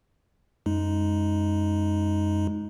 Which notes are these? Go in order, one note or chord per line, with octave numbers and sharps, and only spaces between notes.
F#2 G#3 D#4